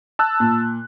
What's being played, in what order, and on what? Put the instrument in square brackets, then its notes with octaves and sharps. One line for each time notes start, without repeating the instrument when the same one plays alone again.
[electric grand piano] A5 E6 F#6
[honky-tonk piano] A#2